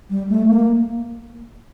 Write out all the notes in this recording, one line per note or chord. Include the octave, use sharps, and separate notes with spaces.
G3
A3
A#3